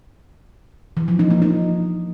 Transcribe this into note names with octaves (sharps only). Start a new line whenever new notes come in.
E3
F3
D#4
A#3
D#4